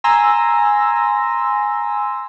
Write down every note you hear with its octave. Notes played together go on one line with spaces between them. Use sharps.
G#5 A#5 C6 E6 A#6